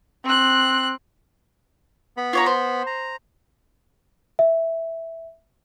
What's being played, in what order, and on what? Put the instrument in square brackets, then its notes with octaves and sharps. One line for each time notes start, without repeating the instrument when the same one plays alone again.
[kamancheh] C4 F#6
[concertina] B3 B5
[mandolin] F4 C#5 A#5
C5
[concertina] A#5
[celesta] E5